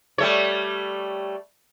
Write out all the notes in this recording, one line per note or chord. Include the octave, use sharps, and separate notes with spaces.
G3 A3 C#5